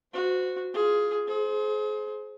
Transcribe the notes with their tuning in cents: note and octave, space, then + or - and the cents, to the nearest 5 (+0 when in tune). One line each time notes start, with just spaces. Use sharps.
F#4 -10 C5 -30
F4 +0 G#4 +10
G#4 +35 C5 +0